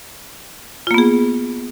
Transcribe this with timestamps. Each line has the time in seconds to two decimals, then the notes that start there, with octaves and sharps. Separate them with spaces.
0.87 F4
0.91 A#3
0.94 B3
0.98 G#4